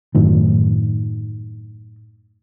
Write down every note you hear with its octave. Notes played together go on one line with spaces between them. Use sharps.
F#2 A2 D#3